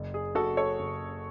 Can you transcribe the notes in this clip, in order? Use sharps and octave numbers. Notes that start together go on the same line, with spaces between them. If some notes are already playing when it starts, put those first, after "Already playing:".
Already playing: F#1
G#4
F#1 F#4 A4
A4 C#5
F#1